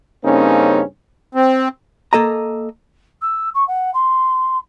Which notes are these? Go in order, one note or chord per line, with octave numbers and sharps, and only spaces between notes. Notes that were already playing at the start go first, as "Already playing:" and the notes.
G2 C#3 A#3 C4 C#4 D#4
C4
A#3 A4 D#5 A#5
E6
C#6
F#5
C6